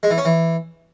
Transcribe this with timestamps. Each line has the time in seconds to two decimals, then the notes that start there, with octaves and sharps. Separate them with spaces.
0.03 G#3
0.10 E3
0.18 C#4
0.25 E3